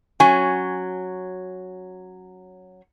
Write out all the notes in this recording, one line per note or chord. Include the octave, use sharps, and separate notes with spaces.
F#3 C#4 G#5